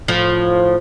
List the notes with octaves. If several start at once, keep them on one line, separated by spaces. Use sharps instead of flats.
A2 F3